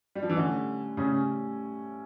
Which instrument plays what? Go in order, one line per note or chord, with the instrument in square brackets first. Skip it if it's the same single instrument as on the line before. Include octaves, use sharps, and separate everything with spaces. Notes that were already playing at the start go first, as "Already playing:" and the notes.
[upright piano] G3
F3
E3
[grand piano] A2 G3 C#4 [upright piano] D3
[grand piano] A2 G3 C#4 [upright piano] C#3